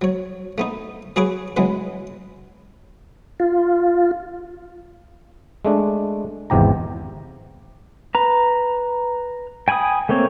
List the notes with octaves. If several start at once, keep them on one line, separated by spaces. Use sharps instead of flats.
F#3 C#5
A3 B3 D#4
F#3 G#4 B4 F#5 C#6 D6
C#3 E3 F#3 G#3 B3
F4
G#3 A3 D4
G#1 E2 C3 G4 A#5
B4 A#5
G5 G#5 B5 C#6 D#6
A3 A#3 C4 C#5